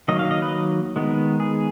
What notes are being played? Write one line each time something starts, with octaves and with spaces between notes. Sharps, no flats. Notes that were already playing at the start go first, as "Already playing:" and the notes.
D#3 F#3 A#3 D#5
F5
D#5
B4
D#3 G#3 B3
G#4